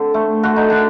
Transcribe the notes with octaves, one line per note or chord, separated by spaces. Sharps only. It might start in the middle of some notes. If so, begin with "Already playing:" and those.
Already playing: D3 C4
A3
D3 F#4
D#4
D3 D4